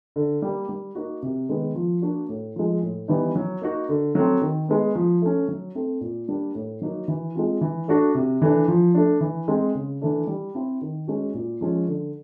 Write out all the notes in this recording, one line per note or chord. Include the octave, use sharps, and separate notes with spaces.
D3
G3 A#3
G3
A#3 D#4 F#4
C3
D#3 G#3 B3
F3
A#3 D4 F#4
A2
F3 G#3
A2
E3 G3 B3 D#4
F#3
A#3 D#4 F#4
D3
F#3 A3 C4
D#3
G#3 B3
F3
A3 C#4
F#3
A3 C4
A#2
G3 A#3 D4
A2
F#3 A#3 D#4 F#4
E3
G#3 C4 F4
E3
A3 D4 F#4
C3
E3 A3 D4
F3
A3 D4
E3
G#3 C4
C#3
E3 A3 D4
G3
C4 E4
D#3
G#3 C#4 F#4
A#2
F3 G#3 C#4
D3